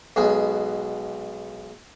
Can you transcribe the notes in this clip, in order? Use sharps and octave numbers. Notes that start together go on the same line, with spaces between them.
B1 B2 G#3